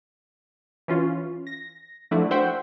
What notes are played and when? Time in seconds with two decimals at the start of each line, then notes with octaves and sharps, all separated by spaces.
0.88 E3 C#4 F4
1.47 A#6
2.11 F3 A3 D4 E4 F#4
2.31 F#4 C5 E5 F#5 G5